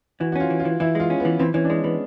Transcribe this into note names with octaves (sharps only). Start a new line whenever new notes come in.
E3 F#4
F#4
C#4 F4
E3
F4
E3
E3 E4
G#3 F4
C#4
B3
E3
E3 C4
E3 C#4
D4
G#3 C#4
E3 B3